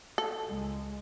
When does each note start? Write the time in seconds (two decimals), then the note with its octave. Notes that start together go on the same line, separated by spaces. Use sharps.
0.18 A4
0.47 C#2 G#3